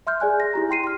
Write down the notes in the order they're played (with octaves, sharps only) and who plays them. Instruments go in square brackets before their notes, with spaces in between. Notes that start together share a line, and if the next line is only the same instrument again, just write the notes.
[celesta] E5 C6 F6 G6
G#4 D5 G#5 F#6
A#6
E4 G4 A#5
E4 G5 C6 C7 D#7
C6 F6